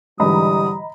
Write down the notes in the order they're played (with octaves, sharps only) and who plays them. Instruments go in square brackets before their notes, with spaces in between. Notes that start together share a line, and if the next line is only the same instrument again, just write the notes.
[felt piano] G#2 D3 E3 [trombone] G3 [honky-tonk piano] D#5 A#5 B5 [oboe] D#6